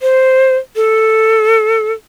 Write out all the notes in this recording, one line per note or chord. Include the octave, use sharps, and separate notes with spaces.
C5
A4